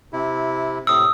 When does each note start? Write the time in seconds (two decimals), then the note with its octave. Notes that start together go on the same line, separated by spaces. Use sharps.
0.13 C3 E4
0.87 A2 C3 D#6 E6